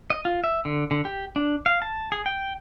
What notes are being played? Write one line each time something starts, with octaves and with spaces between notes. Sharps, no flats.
D#5
F4
E5
D3
D3
G4
D4
F5
A5
G#4
G5